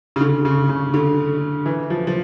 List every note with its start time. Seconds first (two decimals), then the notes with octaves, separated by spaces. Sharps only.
0.16 C#3
0.21 D3
0.45 C#3
0.69 C#3
0.94 D3
1.66 E3
1.90 F3
2.07 F3